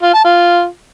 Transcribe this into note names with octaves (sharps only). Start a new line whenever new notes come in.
F4
A5
F4